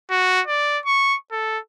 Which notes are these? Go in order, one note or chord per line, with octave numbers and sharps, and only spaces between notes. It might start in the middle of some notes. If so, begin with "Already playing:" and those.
F#4
D5
C#6
A4